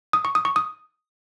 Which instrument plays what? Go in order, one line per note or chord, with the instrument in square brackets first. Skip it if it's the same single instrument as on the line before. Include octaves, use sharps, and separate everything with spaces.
[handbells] D#6
C#6
D#6
C#6
D#6